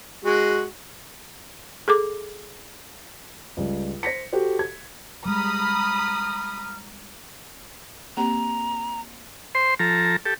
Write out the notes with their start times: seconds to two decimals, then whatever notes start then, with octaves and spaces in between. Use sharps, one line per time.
0.25 G#3 F#4
1.88 G#4 A4 D6
3.57 C#2 G3
4.03 C5 A#6 B6 C#7
4.33 F#4 G4 A4 C5
4.59 G#6
5.26 G3 G#3 A#5 B5 D#6 F6
8.17 A#3 C4 G4 A#5
9.55 C5 C6
9.80 F3 A4 A#5
10.26 G4 A4